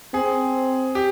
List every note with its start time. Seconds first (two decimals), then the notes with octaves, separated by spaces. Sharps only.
0.14 C4 G#4
0.95 G4